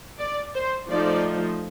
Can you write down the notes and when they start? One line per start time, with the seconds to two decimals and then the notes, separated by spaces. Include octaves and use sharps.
0.19 D5
0.54 C5
0.89 F3 A3 D#4 D5